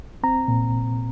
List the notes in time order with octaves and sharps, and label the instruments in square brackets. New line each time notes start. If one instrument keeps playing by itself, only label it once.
[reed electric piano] C4 A#5
A#2